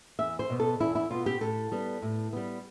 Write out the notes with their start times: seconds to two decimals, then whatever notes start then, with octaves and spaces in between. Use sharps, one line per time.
0.19 E2 E5
0.39 C5
0.50 B2 B3
0.60 A4
0.80 E2 E4
0.95 E4
1.10 B2 B3 F4
1.26 G4
1.41 A2 A4
1.72 G3 B3
2.02 A2
2.33 G3 B3